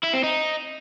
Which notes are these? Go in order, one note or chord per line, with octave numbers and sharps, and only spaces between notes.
E4
C4
D#4